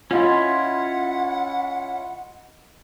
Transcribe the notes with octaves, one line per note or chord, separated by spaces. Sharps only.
C#4 E4 F4 D#5 F#5 C6